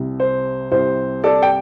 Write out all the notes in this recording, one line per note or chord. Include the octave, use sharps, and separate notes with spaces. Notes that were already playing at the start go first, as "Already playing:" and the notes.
Already playing: C2 C3
C5
C2 C3 C5
A4 D5
G5